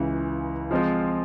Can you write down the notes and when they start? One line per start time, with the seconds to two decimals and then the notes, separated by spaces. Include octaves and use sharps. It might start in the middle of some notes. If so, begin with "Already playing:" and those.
Already playing: C#2 C#3 E3
0.71 F3 G#3 C4 F4